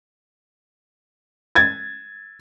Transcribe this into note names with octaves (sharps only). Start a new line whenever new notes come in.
G#6 A6